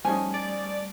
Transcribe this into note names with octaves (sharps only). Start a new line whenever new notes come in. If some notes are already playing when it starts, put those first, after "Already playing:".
F3 G3 A3 C#4 D#4 G#5
D5